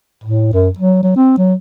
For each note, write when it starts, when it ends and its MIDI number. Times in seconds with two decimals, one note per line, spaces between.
0.24 0.53 45
0.53 0.69 42
0.79 1.02 54
1.03 1.14 54
1.16 1.37 60
1.37 1.54 54